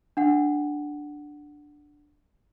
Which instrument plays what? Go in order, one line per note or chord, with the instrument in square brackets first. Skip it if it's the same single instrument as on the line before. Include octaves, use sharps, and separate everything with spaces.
[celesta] D4 F#5